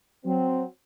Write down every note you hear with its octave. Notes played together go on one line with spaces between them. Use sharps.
F#3 C4